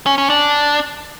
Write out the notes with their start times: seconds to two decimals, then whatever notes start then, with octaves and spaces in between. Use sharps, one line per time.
0.06 C#4
0.18 C#4
0.30 D4